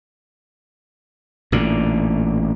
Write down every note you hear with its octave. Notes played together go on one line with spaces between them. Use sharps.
A1 A#2 D3